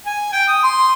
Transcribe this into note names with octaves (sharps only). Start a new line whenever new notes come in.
G#5
G5
D#6
C6